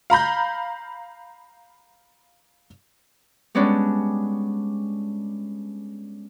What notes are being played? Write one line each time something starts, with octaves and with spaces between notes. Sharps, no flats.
F5 A#5 B5 G6
G3 G#3 B3 C#4 D4